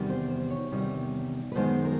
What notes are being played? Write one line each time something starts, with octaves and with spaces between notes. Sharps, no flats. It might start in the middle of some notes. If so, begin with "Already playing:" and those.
Already playing: E2 C3 D#3 G3
C5
C5
C#5
E2 C3 D#3 G3
B4
F#2 D#3 G#3 B3 C5
A#4